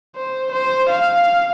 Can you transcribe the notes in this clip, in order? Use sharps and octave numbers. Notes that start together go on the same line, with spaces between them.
C5
C5
F5